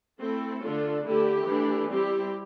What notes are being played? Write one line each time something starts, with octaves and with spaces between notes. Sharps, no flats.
A3 C4 E4 A4
D3 A3 D4 F4
D3 A3 E4 G4
E3 A3 D4
G3 C4 E4 G4